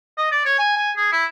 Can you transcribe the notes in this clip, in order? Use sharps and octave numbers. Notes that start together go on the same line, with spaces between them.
D#5
D5
C#5
G#5
G#5
G#4
E4